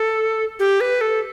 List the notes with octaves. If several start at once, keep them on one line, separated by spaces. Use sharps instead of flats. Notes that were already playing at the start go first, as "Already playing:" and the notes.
Already playing: A4
G4
B4
A4